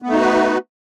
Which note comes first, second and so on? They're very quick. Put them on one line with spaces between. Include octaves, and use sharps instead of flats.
B3 A3 D#4 F#4 B4